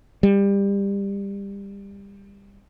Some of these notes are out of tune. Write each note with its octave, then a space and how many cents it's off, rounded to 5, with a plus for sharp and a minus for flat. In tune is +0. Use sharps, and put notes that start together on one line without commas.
G3 +25